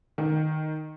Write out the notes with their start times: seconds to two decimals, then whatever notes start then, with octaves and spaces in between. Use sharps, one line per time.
0.18 D#3